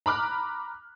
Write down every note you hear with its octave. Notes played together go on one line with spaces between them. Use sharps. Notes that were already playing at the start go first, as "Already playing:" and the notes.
A#5 B5 D6 F6 F#6